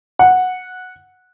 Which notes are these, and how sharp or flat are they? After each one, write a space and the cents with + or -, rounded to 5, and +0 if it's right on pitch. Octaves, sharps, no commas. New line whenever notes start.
F#5 -10